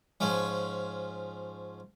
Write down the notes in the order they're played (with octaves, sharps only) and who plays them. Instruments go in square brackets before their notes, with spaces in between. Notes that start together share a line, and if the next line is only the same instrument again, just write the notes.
[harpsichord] G#2 F3 C#4